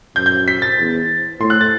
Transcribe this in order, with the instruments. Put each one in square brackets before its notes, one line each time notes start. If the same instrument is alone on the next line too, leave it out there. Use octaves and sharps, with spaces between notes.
[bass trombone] F#2 [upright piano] G6
[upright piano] G6
B6
A6
[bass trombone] E2
[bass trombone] A2 [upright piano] C6
[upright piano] F#6
A6